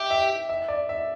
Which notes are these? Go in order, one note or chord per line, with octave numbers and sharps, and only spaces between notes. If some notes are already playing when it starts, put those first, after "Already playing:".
Already playing: G4 E5 G5
E5
E5
D5
E5